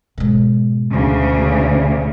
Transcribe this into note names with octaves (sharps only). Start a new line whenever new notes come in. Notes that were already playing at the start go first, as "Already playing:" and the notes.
G#2 B2
D2 C#3